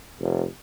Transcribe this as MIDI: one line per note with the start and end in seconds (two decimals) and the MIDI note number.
0.20 0.46 29